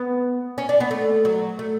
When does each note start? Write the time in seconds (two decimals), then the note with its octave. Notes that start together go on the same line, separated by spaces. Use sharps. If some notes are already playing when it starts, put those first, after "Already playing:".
Already playing: B3
0.58 C#4
0.69 D4
0.80 B3
0.91 A3
1.25 F#3
1.59 A3